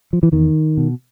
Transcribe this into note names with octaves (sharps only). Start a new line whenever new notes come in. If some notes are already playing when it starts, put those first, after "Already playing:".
F3
E3
E2 D#3
B2